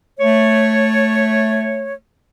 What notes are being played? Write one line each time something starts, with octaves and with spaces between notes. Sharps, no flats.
A3 C#5